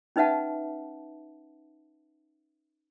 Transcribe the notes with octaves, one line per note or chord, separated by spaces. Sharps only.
C#4 D#4 B4 E5 F#5 A5